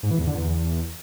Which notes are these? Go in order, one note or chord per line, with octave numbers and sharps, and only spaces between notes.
G#2
E3
E2
D3
E2